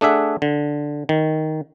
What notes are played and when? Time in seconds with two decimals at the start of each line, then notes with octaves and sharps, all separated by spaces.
0.01 A3 D4 G#4 E5 F#5
0.42 D3
1.09 D#3